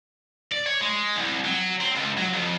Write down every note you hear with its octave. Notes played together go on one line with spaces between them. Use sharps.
D5
C#5
G#3
C2
F#3
C4
C#2
F#3
F2